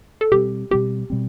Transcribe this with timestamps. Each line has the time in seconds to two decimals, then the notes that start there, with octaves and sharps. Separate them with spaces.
0.21 A4
0.31 B2 G3 C4 G4
0.71 B2 G3 C4 G4
1.10 B2 G3 C4